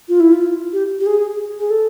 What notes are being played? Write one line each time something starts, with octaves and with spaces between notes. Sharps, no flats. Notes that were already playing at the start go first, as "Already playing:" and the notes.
F4
E4
F4
G4
G4
G#4
G#4
A4